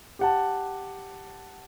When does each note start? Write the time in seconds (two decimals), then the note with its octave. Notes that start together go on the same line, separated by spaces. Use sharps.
0.19 G4 F#5 A5